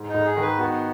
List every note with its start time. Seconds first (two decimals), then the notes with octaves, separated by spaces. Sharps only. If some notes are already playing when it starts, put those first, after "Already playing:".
Already playing: G#2
0.08 D#4
0.14 G#2
0.25 G#4
0.37 D#3
0.42 B4
0.59 B3 F#4